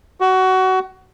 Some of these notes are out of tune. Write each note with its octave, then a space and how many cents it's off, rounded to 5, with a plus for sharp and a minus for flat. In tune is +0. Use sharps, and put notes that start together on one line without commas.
F#4 +20